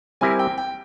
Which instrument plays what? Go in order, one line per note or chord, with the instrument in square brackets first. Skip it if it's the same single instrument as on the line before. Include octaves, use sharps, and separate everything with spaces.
[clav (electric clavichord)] G3 C4 E4 G4 A#4 [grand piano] G#5
[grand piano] G5
G5